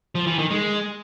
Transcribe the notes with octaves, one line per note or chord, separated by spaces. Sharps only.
F3
E3
D#3
G#3